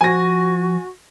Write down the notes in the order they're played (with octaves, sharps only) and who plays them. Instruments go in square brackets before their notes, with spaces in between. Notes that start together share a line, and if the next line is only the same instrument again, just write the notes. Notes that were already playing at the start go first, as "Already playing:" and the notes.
[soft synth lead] F3 [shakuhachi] F#4 [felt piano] G#5 A#6